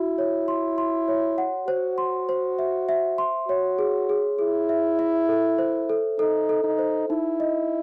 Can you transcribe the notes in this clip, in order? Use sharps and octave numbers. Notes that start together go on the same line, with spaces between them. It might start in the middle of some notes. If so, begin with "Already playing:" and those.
Already playing: E4 F#4
C#5
C6
C6
C#5
F#5
F#4 C5
C6
C5
E5
E5
C6
F#4 C#5
G#4
G#4
E4 G#4
E5
E5
A4
C5
A4
D#4 A4
A4
D#4
C5
D#4 E4
D#5